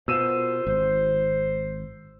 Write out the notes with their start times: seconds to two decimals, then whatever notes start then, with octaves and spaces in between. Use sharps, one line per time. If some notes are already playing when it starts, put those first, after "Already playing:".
0.08 B2 F4 A#4 C5 E6 D#7 E7
0.67 G#1 C5